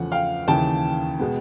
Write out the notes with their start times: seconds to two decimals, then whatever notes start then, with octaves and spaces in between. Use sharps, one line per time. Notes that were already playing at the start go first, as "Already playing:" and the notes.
Already playing: E2 C#3 F3 A3 F#5
0.12 F5 G5
0.48 D#2 C#3 E3 G5 A5
1.20 B2 G#3 B3